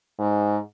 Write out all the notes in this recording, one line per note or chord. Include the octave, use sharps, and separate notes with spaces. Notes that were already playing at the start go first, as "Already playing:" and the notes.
G#2